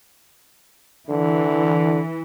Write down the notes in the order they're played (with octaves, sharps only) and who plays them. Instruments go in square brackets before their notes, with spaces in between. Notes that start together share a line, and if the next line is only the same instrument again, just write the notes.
[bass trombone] D3 [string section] E3